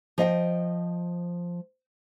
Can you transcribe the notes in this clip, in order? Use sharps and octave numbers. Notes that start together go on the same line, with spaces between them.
F3 D#5 F5 G5